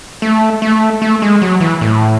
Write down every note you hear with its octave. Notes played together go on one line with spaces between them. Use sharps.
A3
A3
A3
G#3
F#3
E3
A2